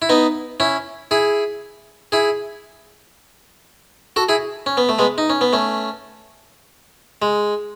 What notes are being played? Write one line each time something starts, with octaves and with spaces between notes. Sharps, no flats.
E4
B3 D#4
C#4 E4
E4 G#4
E4 G#4
F#4 A4
E4 G#4
C#4
B3
A3
G#3 B3
D#4
C#4
B3
A3 C#4
G#3